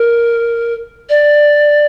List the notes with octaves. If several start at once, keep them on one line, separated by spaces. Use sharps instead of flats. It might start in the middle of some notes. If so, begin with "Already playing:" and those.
Already playing: A#4
D5